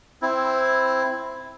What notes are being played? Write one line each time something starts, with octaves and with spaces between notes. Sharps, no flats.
C4 E4